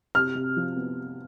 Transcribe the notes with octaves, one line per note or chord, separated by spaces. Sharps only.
C3 F6
C3
F3
B3